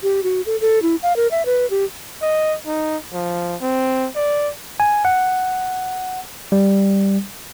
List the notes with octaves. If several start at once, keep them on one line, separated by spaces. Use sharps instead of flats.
G4
F#4
A4
A4
E4
F5
A#4
E5
B4
G4
D#5
D#4
F3
C4
D5
G#5
F#5
G3